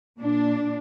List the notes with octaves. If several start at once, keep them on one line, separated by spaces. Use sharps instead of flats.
A#2 D4